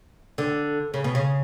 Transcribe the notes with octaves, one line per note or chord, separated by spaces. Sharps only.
D3
C#3
B2
C#3